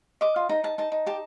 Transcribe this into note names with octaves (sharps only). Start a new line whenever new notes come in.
D#5 D6
F4
D#4 A#5
D#4 A5
D#4 A5
D#4
G4 A5